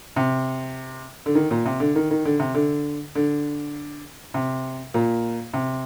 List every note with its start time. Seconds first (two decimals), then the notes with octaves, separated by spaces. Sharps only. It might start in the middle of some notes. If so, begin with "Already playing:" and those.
0.16 C3
1.26 D3
1.35 D#3
1.51 A#2
1.66 C3
1.80 D3
1.96 D#3
2.11 D#3
2.25 D3
2.39 C3
2.54 D3
3.15 D3
4.34 C3
4.94 A#2
5.53 C3